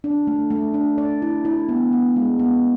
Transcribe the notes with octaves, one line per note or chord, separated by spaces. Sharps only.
D4
A3
A3
D4
D5
E4
E4
B3
B3
G#3
B3